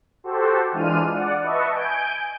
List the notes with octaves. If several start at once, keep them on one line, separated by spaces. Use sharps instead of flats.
F#4 G4 A4 C5
E3 G#3 D4 F4 F6 D#7
D5 F#5
B4 D#5 E5 A5 C#6
G#5 G6 D7